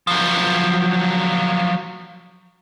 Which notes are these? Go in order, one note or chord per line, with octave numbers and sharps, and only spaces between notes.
F3 F#3